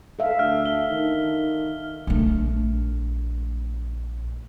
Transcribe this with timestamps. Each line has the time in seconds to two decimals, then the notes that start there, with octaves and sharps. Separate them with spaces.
0.19 A4 E5 F5
0.39 D2 F6
0.66 G7
0.91 D#3
2.07 A#1 A3